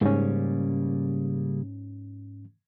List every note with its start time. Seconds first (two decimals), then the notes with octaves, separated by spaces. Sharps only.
0.01 G#2 C#3 G3 A#3 C#4